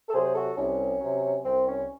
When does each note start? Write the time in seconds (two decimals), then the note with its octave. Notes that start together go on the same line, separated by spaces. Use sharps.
0.09 A4
0.13 C3 F#3 G#4 C5
0.25 C5
0.34 F#4 A4
0.57 C2 C#4
1.01 C3 F#3
1.44 C2 C4
1.67 C#4